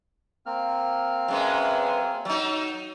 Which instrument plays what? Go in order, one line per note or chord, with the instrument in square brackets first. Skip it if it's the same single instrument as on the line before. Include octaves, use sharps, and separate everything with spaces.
[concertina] A#3 C4 F6
[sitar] F#2 G#3 B3
F#3 D#4